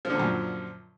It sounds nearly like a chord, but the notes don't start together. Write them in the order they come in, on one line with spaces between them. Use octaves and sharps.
F3 D3 A#2 F#2